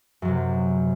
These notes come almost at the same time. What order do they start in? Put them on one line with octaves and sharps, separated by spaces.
F#2 F#3 C3